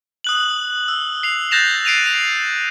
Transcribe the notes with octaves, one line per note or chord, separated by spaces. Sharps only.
D#6 F#6 F#7
E6
C7 F7
F#6 G6 A6 A#6 E7 F7
C7 D7 D#7 F7
F7